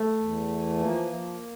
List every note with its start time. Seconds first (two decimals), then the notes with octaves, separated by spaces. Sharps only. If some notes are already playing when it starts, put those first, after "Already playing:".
Already playing: A3
0.18 E2
0.49 E3
0.79 F3 A#3
1.11 F3